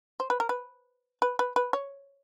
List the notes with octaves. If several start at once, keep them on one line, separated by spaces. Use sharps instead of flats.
C5
B4
A#4
B4
B4
B4
B4
C#5